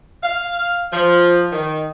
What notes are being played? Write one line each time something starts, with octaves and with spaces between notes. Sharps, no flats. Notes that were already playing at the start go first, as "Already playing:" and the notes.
F5
F3
D#3